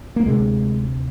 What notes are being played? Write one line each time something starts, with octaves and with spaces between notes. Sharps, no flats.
A#3
D2 C3 G#3